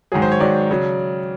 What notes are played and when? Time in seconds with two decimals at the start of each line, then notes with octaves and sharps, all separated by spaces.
0.12 G#2 D#3 F#3 G#4
0.22 C5
0.32 C#5
0.40 G#2 D#3 F#3 D5
0.71 C#3 F#3